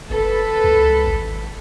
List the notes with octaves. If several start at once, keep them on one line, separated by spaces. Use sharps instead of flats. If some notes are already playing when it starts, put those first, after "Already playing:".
F#1 A4 B4
C#2
G#1